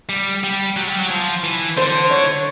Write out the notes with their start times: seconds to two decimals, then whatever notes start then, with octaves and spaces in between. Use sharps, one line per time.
0.09 G3
0.44 G3
0.76 F#3
0.88 G3
0.99 F#3
1.10 F3
1.44 E3
1.77 D3 C5
2.11 C#5